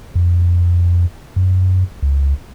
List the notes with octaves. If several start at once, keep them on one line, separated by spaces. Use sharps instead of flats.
F2
F#2
C#2